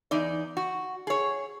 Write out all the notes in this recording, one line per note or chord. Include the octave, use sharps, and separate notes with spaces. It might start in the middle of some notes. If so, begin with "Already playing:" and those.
E2 D#4 D5
F#4
G#4 C#5